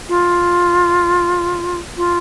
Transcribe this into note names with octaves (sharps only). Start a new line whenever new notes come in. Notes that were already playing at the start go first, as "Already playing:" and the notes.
F4
F4